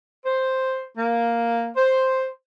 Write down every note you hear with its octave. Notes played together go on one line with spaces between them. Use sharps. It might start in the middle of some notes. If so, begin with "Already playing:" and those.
C5
A#3
C5